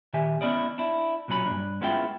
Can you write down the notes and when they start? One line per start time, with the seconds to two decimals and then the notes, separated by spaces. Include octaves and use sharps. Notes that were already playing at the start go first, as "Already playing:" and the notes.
0.13 A#2 D#3 G4 E5 G#5
0.41 B3 C#4 E4 D5 D#5
0.78 D4 E4
1.28 B1 A#2 F#3 C#4 B5
1.46 G2 D4
1.81 G#3 B3 C#4 E4 F4 G5